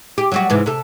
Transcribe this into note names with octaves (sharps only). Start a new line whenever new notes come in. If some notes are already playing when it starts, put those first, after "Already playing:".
G4
F#3 G3 F#4
G#2 C3 E3
C3 A4